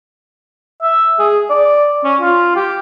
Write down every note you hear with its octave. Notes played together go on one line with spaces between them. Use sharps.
E5
G#4
D5
C#4
F4
G4